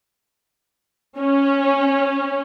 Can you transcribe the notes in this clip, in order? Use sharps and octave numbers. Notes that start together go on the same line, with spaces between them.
C#4